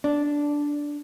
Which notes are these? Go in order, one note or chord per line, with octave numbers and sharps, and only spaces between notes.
D4